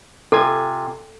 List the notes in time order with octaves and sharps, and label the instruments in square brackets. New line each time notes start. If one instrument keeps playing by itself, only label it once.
[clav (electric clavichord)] C3 F4 G#5 [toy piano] A4